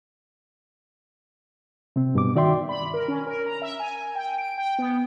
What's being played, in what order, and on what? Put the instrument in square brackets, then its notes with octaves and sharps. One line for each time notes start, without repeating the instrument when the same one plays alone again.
[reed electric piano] C3 C4
G2 B2 D6
D#3 F#4 D5 E5 G5 C6
[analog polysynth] B5
A#4
C#4
A#4
A#5
E5
G#5
G5
D7
G5
B3